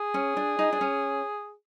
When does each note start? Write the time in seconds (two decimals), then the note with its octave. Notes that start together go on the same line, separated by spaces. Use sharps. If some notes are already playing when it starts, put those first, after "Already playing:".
Already playing: G#4
0.14 C#4
0.37 D4
0.59 D#4
0.73 D4
0.81 C#4